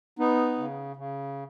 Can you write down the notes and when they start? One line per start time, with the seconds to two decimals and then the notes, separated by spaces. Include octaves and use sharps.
0.19 B3 D#4
0.58 C#3
0.96 C#3